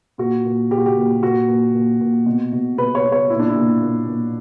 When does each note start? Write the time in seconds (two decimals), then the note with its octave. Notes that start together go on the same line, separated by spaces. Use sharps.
0.18 A#2 F#4
0.45 A#2
0.71 A#2 G4
0.78 F#4
0.86 G4
0.97 A#2
1.22 A#2 F#4
1.48 A#2
1.74 A#2
2.01 A#2
2.26 B2
2.52 B2
2.78 B2 B4
2.95 C#5
3.04 B2
3.12 C#5
3.30 A#2 E4
3.40 D4
3.49 E4
3.56 A#2
3.82 A#2
4.08 A#2